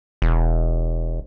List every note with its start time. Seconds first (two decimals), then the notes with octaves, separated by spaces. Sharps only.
0.22 E1